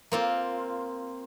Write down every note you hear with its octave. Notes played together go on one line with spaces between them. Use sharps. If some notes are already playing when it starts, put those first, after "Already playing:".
A#3 C4 F4